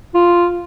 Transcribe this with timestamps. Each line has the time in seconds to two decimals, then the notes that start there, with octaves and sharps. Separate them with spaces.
0.15 F4